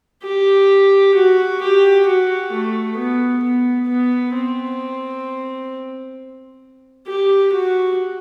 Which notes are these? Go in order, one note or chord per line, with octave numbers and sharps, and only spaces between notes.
G4
F#4
G4
F#4
A3
B3
B3
B3
C4
G4
F#4